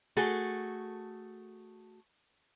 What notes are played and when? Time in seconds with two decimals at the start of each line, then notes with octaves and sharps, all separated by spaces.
0.17 A3 F#4 G#4 A4